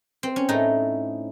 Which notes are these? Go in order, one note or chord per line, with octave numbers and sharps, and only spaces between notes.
C4
C#4
A2 A3 D#4